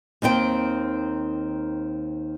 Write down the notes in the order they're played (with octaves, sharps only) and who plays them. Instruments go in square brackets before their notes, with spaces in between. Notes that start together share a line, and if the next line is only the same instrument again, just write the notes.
[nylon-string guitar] D#2 D#3 C4 G5